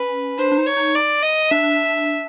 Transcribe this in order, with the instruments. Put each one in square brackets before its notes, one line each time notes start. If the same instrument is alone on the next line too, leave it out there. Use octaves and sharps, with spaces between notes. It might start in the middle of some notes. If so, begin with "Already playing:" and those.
Already playing: [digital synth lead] C#4 [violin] B4
[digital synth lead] D4 [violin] C5
[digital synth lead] D4
D#4
[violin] C#5
[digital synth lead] D#4
[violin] D5
D#5
[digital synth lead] D4 [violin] E5